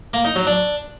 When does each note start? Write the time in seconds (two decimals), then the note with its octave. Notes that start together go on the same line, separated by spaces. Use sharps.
0.14 A#3
0.25 D#4
0.36 F#3
0.47 D4